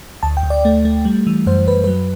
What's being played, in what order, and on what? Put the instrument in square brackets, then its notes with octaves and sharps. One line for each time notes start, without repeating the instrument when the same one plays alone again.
[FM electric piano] D2 A5
G5
D2
D5
A3
A3
G3
E3
F#2 C5
F#2 B4
F#3 B4